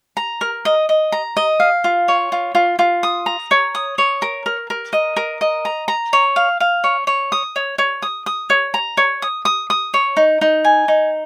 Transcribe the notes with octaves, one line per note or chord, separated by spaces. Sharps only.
A#5
A#4
D#5
D#5
A#5
D#5
F5
F4
C#5
F4
F4
F4
D#6
A#5
C#5
D#6
C#5
A#4
A#4
A#4
D#5
A#4
D#5
A#5
A#5
C#5
F5
F5
C#5
C#5
D#6
C#5
C#5
D#6
D#6
C#5
A#5
C#5
D#6
D#6
D#6
C#5
D#4
D#4
G#5
D#4